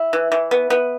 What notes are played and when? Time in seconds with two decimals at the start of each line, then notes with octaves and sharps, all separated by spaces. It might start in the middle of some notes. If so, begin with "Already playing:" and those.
Already playing: E4
0.13 E3
0.32 E3
0.51 B3
0.70 B3